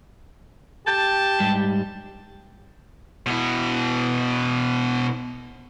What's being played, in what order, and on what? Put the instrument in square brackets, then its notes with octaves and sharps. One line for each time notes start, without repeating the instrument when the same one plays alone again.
[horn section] G4 G5 A5
[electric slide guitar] G#2 G3
[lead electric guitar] B2 E4